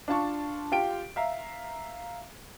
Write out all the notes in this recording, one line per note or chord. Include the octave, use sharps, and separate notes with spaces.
D4 F4 A5 C#6
F4 G4 G5 D7
E5 F5 A#5